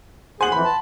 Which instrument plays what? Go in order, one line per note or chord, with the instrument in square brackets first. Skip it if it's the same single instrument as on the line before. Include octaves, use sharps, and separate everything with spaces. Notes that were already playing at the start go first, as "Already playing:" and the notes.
[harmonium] D#2 G#4 [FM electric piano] C5 F#5 [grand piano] G#5 F#7
[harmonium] F2 E3 [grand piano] B5
[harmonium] A5